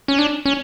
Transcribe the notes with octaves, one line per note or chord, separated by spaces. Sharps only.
C#4
D4
C#4